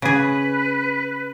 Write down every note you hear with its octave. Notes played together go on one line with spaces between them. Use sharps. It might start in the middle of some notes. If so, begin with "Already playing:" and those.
C#3 G#4 B4